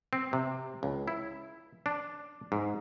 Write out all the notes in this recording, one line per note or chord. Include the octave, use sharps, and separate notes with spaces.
C4
C3
C#2
E4
D4
G#2